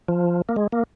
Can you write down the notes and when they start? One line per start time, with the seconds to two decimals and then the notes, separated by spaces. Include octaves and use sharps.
0.08 F3
0.49 A#3
0.56 G#3
0.72 A#3